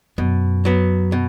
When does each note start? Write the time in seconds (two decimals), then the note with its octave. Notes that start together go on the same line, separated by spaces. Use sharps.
0.18 F#2 B2
0.65 F#3 B3
1.12 B2